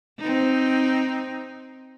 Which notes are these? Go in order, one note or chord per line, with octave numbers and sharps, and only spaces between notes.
C4 D#4